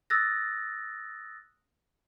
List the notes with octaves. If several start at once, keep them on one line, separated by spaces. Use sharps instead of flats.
D#6 E6 F#6 A6 A#6